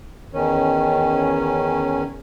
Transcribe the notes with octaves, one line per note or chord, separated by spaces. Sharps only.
E2 D#3 C#4